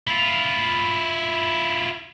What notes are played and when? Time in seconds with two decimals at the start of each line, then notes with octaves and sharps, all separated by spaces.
0.07 E4 F4